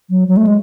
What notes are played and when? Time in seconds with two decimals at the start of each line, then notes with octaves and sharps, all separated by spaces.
0.10 F#3
0.28 F#3
0.37 A3
0.47 G#3